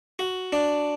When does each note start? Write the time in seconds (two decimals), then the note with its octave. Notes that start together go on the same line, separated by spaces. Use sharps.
0.19 F#4
0.53 D4